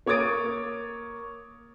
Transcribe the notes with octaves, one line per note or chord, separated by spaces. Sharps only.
A#3 C#5 D6 D#6 A6 D7